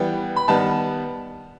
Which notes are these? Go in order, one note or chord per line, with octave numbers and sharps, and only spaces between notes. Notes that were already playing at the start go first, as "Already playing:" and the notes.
Already playing: E3 G3 B3 G5
B5
D#3 G3 B3 A5